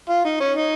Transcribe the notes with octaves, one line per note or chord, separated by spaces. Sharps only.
F4
D#4
C#4
D#4